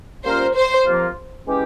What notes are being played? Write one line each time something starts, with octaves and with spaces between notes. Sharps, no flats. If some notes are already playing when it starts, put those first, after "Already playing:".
G3 A#3 C#4 F4 A#4 C5
C5
C3 F3 A#3 F4
E3 G#3 C#4 E4 G4